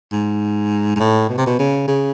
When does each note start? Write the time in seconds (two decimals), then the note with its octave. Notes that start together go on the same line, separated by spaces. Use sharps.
0.12 G#2
0.96 G#2
1.00 A2
1.29 B2
1.38 C3
1.47 B2
1.59 C#3
1.88 C#3